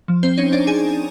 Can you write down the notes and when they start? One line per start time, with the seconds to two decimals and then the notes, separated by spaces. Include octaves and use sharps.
0.08 F3
0.23 C4 C5
0.38 C#4 D#4 C#5
0.52 D4 D5
0.67 D#4 G#4 G#5